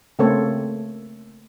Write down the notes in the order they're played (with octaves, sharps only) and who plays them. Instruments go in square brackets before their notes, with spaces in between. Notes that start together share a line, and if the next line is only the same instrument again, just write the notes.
[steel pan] C#3 A3 A#3 C4 A4 C#5